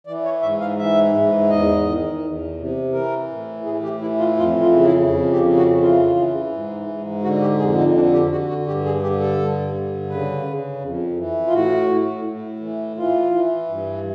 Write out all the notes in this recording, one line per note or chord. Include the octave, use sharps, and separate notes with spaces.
E3 D5
C#5
G#2 E5
F5
E3 E5
G#2
E2 D#5
D#3
E2
C3
E3 A#4
A2
A2 G#4
G4
E3 E4
F4
F2 F4
F4
C#3
E4
F2
G4
C#3
F#4
E3 F4
E3
G#2
G#2
D3 F#4
G4
F2 G#4
D#4
D3 D4
G4
D3 F#4
F#4
G2 G4
G#4
D3 G4
A4
G2
D3
C#3 B4
C#3
F2
E3
F4
A2 F#4
A2
A2
E3
E3 F4
E3
G2